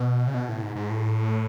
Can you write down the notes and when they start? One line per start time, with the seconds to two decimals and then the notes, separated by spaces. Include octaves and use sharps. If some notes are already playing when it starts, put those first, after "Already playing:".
Already playing: B2
0.27 C#3
0.34 B2
0.48 A2
0.62 G#2
0.76 G#2
0.90 A2